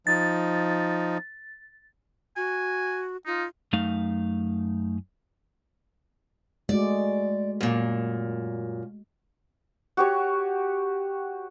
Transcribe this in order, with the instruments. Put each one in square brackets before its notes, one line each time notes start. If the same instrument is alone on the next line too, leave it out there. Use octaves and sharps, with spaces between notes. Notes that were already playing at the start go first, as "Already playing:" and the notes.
[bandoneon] F3 D#4 [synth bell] A6
[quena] F#4 [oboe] G#5
[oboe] D#4 [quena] F4
[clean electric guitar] F#2 A3 D#4 F5
[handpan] G#3 A3 F#4 [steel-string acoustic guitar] D5
[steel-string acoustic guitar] F#2 A#2
[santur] F#4 G4 C#5